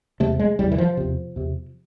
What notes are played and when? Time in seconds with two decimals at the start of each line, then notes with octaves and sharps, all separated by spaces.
0.20 E2 C3 A3
0.39 G#3
0.59 E2 C3 G3
0.72 E3
0.78 F3
0.97 E2 C3
1.36 E2 C3